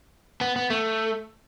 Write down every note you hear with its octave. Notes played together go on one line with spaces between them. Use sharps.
B3
B3
A3